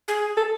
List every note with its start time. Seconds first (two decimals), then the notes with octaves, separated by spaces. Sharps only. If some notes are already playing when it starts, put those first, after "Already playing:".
0.08 G#4
0.37 A4